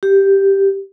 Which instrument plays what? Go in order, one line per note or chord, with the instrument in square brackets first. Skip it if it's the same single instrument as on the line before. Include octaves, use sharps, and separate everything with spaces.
[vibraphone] G4